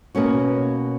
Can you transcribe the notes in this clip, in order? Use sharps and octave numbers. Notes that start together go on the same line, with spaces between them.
B2 A#3 C#4 F#4